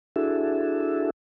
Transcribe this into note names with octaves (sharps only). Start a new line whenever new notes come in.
D4 E4 F#4 G#4 A4 E5